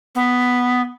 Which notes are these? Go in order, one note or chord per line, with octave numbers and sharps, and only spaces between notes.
B3